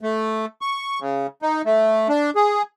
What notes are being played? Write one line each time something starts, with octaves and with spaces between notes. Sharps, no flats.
A3
C#6
C#3
D#4
A3
D4
G#4